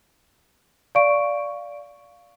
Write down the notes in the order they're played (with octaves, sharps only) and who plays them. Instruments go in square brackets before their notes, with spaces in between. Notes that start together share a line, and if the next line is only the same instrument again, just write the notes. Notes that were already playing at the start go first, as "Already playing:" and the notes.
[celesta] D5 F5 C#6 D7